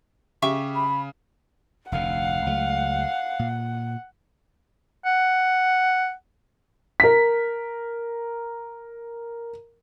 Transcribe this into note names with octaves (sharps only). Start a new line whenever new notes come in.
C#3 G4 E5 C#6
B5
F1 D2 D3 F5 F#5
C#2 F#3 A3
A#2
F#5
A#4 B6